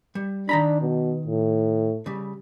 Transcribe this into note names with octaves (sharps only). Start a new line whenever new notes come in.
G3
D#3 D4 A#5 B5
B2
A2
C#3 G3